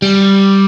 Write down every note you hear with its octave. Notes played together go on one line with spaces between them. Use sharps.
G3